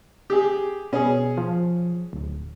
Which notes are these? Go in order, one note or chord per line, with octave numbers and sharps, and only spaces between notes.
G4 G#4
B2 C#4 G#4
F3
D1